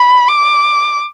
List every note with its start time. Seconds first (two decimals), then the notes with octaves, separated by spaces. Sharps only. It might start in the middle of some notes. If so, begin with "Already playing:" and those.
Already playing: B5
0.28 D6